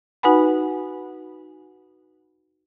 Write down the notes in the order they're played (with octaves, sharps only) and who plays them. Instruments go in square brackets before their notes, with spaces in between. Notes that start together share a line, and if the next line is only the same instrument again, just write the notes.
[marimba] D#4 F#4 B4 F#5 G#5 B5